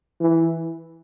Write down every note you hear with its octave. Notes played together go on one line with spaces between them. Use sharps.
E3